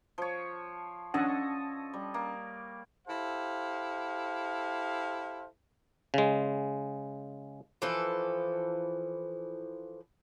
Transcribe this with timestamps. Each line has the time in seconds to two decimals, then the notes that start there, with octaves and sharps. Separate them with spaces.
0.18 F3 C#5
1.14 C#4 D4 A4 C#5 D#5 F#5
1.94 G3
2.14 A#3
3.07 E4 G4 A4 C5 F5
6.14 C#3 G#3
7.82 E3 F3 A4